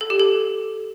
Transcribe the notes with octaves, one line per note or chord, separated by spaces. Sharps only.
A4
G4
A4